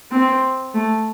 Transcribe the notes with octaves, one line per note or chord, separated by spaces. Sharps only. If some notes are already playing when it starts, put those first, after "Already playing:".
C4
A3